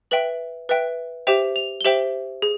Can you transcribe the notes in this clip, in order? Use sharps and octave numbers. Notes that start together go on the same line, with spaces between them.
B4 E5 G5 F#7
B4 E5 G5
G4 C5 E5 G5 F7
F7
G7
G4 C5 E5 G5 F#7
G#4